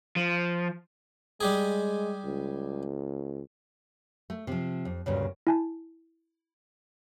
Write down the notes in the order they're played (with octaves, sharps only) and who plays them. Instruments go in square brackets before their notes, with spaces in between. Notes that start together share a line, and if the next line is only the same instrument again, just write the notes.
[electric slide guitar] F3
[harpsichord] G3 G4 G#4 [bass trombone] G#3
[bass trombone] C#2
[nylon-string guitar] A3
C3 F3
F2
D2 G2 A#2 C#3
[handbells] E4 G#5 A5